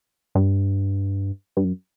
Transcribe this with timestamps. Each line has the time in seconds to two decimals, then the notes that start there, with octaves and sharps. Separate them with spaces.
0.35 G2
1.57 G2
1.64 F#2